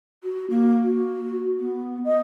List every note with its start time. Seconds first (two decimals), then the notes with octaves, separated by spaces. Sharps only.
0.23 F#4
0.50 A#3
0.82 F#4
1.59 B3
2.04 D#5